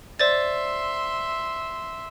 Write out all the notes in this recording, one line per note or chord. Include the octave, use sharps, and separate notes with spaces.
C5 D5 E5 C6 A6